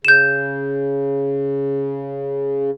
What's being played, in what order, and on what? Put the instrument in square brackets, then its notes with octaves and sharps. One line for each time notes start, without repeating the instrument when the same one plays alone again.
[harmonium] C#3 [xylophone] G6 E7